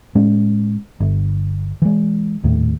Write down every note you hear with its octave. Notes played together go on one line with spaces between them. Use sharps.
A2 G#3 C#4
G1
E3 G#3
D#1 D#2 A2